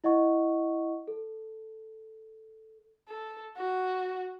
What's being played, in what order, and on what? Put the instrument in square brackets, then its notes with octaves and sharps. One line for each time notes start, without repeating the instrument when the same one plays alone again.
[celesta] E4 D#5 F#5 C#6
A4
[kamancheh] A4
F#4